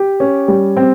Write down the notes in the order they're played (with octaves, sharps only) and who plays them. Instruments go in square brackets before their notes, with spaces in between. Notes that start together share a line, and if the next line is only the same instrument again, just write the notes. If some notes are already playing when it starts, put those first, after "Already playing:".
Already playing: [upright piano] G4
C#4
G3
C4